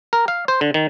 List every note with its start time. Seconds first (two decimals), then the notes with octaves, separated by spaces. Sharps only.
0.13 A#4
0.28 F5
0.48 C5
0.61 D3
0.74 D#3